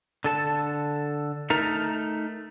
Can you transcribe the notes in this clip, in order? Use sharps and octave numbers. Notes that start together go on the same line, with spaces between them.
D3 A4 A5
A3 D#4 A#4 A#5